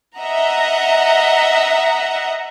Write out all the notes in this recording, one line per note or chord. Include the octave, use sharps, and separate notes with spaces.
D#5 E5 F#5 A#5